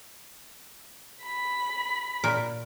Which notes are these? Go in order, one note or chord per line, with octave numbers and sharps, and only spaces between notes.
B5
A#2 A#4